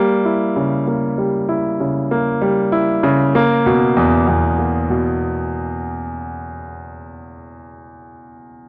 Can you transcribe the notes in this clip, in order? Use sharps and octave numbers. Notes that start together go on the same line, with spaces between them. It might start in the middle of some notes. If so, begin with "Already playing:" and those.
Already playing: G3 A#3
E4
C#3
A#3
G3
E4
C#3
A#3
G3
E4
C#3
A#3
B2
E2
E2
A#3
B2